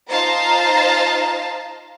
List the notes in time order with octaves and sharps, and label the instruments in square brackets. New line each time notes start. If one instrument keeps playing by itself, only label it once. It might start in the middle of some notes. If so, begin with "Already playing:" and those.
[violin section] D#4 F4 C5 F5 A5 A#5